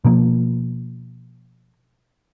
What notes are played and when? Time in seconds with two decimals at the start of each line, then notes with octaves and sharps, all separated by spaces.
0.04 B2 F3 A#3